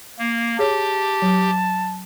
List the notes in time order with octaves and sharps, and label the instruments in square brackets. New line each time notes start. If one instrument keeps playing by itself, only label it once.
[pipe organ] A#3
[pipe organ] G4 [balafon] G#4 C#5 [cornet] A5
[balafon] F#3